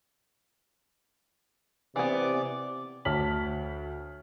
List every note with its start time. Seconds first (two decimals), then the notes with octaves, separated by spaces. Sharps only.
1.96 C3 E3 B3 D5 D6
3.05 D2 C#5 A5 F6 B6 F#7